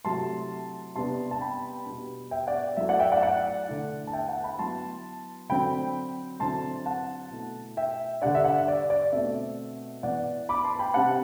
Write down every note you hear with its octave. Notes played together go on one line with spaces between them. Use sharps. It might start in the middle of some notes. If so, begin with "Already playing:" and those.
C3 F#3 A3 E4 A5 C6
C3 G3 B3 D4 A5 C6
A5
G5 B5
B2 G3 B3
E5 G5
D5 F#5
F#3 A3 E4 E5
D5 F#5
E5 G5
D5 F#5
D5 F#5
D3 A3 E4
A5
E5 G5
F#5 A5
G5 B5
F#3 B3 E4 A5 C6
D3 F#3 C4 G5 B5
D3 F#3 C4 E4 A5 C6
F#5 A5
B2 A3 E4
E5 G5
D3 G3 D4 D5 F#5
E5
D5 F#5
D5
D5
B2 A3 C4 E5
E3 B3 E4 D5 F#5
B5 D6
A5 C6
G5 B5
C3 G3 C4 F#5 A5